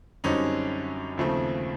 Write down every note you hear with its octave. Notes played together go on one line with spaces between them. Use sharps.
F#2 D3 G3 C4 C#4 D#4
D#2 C#3 F3 A3 C4